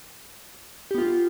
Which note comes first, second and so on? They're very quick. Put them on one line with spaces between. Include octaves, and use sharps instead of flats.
G4 B3 F4